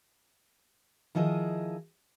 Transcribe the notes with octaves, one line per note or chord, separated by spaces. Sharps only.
D#3 F3 E4 G#4 D#5